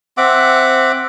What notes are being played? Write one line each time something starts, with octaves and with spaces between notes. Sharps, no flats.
C4 E5 F#5 D6